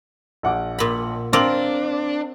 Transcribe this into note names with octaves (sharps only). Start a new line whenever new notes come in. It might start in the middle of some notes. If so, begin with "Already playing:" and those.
A#1 F#5 D6
A#2 B5
C4 D4 F4 A#4 D6 F#7